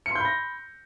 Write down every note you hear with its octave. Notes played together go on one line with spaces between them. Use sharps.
B5 C6 G6 A#6 C#7